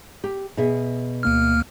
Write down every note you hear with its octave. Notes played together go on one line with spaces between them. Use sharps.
G4
B2 G#4 E5
D2 A#3 F6